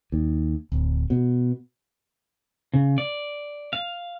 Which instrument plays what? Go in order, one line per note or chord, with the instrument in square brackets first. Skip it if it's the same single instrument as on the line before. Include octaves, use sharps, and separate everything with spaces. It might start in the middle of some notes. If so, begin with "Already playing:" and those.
[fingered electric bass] D#2
D1
B2
[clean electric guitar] C#3
D5
F5